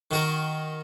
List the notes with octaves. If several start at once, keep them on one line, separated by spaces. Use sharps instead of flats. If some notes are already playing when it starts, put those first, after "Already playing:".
D#3 F#4 A#4